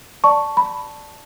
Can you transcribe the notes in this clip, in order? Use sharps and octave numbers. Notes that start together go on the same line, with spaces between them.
D5 A5 C#6
B5